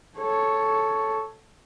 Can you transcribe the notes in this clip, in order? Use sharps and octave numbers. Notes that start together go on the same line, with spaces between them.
A4 C#5